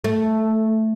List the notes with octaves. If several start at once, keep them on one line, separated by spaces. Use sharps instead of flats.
A3